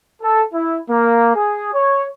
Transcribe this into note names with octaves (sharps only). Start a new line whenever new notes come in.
A4
E4
A#3
G#4
C#5